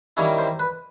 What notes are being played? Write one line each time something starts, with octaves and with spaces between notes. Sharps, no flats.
D#3 G3 A#3 C#4 E4 C#5
C5
B4